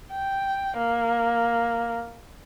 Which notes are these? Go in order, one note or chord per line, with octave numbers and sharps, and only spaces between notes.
G5
A#3